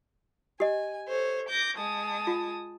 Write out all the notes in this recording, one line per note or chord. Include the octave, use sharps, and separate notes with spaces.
G4 D#5 G#5
A4 C5 C#5
D6 G6 A#6
G#3 A5 D#6
F4